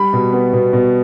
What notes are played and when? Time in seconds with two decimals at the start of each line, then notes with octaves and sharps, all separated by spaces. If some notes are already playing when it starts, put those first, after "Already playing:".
Already playing: G3 B5
0.13 B2
0.33 B3
0.53 B2
0.73 B2